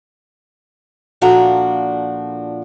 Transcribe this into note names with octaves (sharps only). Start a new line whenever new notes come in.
A#2 F3 D4 F#4 A4 A#5